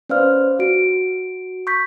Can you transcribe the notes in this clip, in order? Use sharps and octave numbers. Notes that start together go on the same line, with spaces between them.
C#4 B4 C5 D5 F5 F6
F#4 D7
C#6 G6 B6